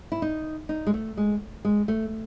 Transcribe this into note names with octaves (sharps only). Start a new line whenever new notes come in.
E4
D#4
D#4
G#3
A3
G#3
G#3
A3